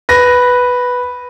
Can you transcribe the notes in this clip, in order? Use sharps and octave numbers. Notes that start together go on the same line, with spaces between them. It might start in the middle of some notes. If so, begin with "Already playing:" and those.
B4 A#6